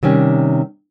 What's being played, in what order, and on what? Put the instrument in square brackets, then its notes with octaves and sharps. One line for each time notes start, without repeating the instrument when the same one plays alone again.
[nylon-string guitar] C3 D#3 G3 C#4